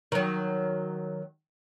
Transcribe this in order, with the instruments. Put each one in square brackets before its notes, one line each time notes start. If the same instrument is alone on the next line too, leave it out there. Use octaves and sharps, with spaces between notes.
[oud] D#3 F#3